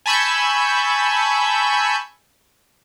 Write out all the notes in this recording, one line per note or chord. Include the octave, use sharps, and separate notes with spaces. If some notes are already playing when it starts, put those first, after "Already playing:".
G#5 A5 B5 C#6 E6 G6